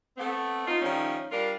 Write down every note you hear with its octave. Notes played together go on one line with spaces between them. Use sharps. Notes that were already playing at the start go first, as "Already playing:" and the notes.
A3 B3 C4
D#4 F4
D#3 F3 G3 A3 C#4
G3 D4 F4 A#4